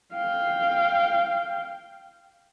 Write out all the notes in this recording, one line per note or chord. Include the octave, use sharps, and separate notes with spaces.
F5 G5